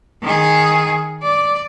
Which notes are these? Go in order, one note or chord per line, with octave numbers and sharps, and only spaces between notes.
D#3 G#4
D5